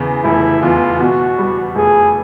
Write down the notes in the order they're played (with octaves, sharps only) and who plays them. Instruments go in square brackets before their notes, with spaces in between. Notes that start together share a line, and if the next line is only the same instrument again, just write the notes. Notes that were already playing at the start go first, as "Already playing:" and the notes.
Already playing: [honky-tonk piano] E2 C#3
[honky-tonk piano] F1 [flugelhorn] E4
[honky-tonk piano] E2 [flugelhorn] F4
[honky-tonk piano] B2 [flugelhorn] F#4
[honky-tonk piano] G3
[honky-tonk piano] F1 [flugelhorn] G#4